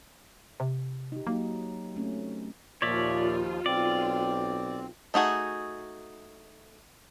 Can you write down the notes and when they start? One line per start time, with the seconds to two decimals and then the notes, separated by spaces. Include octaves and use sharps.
0.60 C3
1.12 D#4 G4
1.27 F#3 A#3 D#4
1.96 A3 C4 C#4
2.82 D#2 A#2 F3 F4 C#5 D5 E5
3.66 B1 C4 D5
5.14 A3 D#4 F#4 G#4